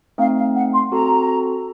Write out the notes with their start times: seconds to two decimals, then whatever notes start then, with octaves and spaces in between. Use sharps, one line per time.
0.18 A3 C4 D#4 F5
0.36 F5
0.55 F#5
0.74 C6
0.92 C4 F#4 A4 A#5